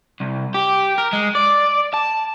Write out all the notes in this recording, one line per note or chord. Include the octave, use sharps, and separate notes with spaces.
C2
G4
A#4
G#3
D5
A5